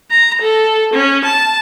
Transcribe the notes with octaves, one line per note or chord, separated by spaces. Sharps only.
A#5
A4
C#4
A5